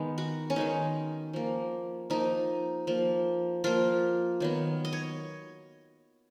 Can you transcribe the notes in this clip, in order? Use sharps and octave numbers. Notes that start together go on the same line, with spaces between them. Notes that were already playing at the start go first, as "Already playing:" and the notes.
Already playing: D#3 G#3 B3 D#4
F#4
C#4
D#3 G#3 B3 D#4
F3 A#3
F3 A#3 D#4
F3 A#3
F3 A#3 F4
D#3 F#3 B3
D#5
C#5